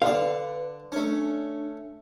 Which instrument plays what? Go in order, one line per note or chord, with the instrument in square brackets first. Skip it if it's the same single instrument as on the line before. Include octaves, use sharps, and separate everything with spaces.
[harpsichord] D3 D5 [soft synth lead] B4 [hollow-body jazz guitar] F5
[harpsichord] A3 C#4 [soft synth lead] D4